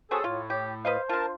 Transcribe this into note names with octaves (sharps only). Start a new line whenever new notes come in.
G3 C4 F#4 G#4 A4 C#5
A2 F4
G4
B4 C5 D#5 F5
D4 F4 A#4 A5